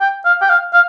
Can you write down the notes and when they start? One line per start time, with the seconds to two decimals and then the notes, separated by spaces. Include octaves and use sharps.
0.01 G5
0.25 F5
0.41 G5
0.50 F5
0.73 F5